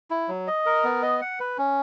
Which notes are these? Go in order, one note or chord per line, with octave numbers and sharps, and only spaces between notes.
E4
F#3
D#5
A#4
B3
D#5
F#5
B4
C#4